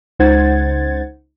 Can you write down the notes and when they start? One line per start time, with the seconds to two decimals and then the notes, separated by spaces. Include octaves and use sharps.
0.19 C#2 D#4 C5 F#5 G#6 A6